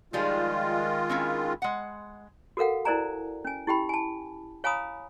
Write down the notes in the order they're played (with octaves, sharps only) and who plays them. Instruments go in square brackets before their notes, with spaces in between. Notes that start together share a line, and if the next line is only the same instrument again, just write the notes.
[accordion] D#3 G#3 F4 [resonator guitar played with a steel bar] F3 G3 G#4
[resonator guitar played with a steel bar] C4 C#4 E4
G#3 F#5
[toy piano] F#4 A4 A#4 F5 F#5
E4 A#4 C5 D5 G#5 A#5
C#4 G#5
E4 G4 G5 B5
G#5 A5
C#5 F5 G#5 A#5 B5 D#6